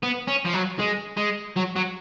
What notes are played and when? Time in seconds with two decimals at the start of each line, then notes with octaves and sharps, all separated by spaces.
0.03 B3
0.28 C#4
0.45 F3
0.54 F#3
0.80 G#3
1.17 G#3
1.56 F#3
1.76 F#3